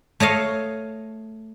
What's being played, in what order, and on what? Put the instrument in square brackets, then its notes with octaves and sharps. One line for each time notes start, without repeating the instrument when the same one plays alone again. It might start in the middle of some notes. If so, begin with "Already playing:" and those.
[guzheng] A3 C#5 D#5 F5